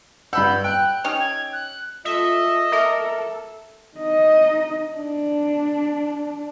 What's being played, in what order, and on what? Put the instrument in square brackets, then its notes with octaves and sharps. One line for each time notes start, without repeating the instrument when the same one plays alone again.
[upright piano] G2 B5 E6 [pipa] F#5 [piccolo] G6
[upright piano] G5 [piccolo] F#6
[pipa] C#4 D#4 G4 [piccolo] F7
[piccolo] G#6
F#6
[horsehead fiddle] F4 A4 [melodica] D#5 [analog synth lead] E5
[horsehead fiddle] A4 [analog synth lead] A#4 [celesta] E5 D6
[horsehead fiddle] D#4 D#5
D4